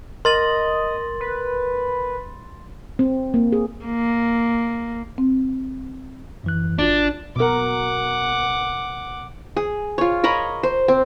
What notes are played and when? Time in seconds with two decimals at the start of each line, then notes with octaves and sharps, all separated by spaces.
0.25 A#4 D#5 C6 A6 F#7
1.20 B4
2.99 C4
3.34 A#3
3.52 G#4
3.86 A#3
5.18 C4
6.44 F#2 E3 F#6
6.79 G#1 D4 F4
7.36 B2 A#4 F#5 D6
9.57 G#4
9.98 F4 C#5
10.24 A#4 C#5 D#5 B5
10.63 C5
10.88 C4